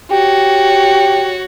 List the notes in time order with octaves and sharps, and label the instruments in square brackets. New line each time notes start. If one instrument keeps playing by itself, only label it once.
[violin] F#4 C#5 [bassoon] G4